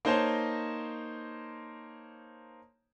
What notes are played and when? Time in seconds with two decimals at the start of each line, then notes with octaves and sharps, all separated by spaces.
0.05 A#3 D#4 C5 C#5 A5 A#5